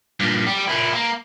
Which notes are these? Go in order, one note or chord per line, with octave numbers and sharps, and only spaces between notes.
G2 A#2
G3
A#2 E4
A#3